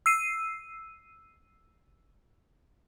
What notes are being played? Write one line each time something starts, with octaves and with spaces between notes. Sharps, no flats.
E6 C7 D#7